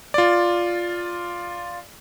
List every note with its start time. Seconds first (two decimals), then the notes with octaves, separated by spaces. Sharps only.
0.14 F4 D5